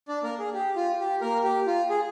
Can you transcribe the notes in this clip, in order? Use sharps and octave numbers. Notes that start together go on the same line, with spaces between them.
D4 D5
A#3 A#4
G#4
G4
F4
G4
A#3 A#4
G4
F4
G#4